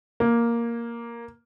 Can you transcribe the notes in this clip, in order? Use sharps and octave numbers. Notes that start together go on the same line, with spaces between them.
A#3